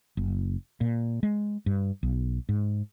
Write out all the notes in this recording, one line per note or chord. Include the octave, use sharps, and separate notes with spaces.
F#1
A#2
G#3
G2
B1
G#2